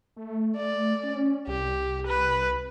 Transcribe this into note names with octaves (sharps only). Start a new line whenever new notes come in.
A3
D5
C#4
C2 G4
B4